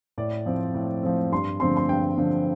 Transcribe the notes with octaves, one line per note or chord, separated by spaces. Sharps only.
A2 D5
F3 C4
A2
F3 C4
G2 C6
D3 F3 C4 C6
C6
G2 G5
D3 F3 C4